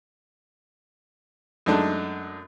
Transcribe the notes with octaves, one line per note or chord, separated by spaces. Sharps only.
F#2 G#3 A3 D4 D#4